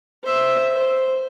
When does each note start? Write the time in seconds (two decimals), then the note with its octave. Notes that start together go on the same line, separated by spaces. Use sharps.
0.24 C5 E5
0.75 C5